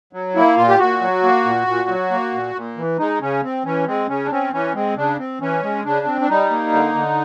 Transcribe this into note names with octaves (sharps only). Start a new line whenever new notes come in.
F#3
A#3 E4
A#2 F4
G4
A#2 F#4
F#3
A#3
A#2
A#2
F#3
A#3
A#2
A#2
E3
G#3 D#4
C#3 C#4
C4
E3 C#4
G#3 C4
C#3 C#4
D4
C4 C#4
E3 C#4
G#3 C4
C#3 D4
C4
E3 C#4
G#3
C#3 D4
C4
D4
G3 D#4
A#3
D3
D3